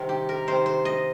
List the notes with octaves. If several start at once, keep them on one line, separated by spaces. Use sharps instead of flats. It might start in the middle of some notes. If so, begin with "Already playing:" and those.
Already playing: C3 D#3 G3 C4 A#4 C5
G4
A#4
C3 D#3 C4 C5
C5
D#5